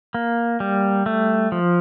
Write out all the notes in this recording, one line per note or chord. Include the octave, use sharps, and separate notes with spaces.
A#3
G3
A3
F3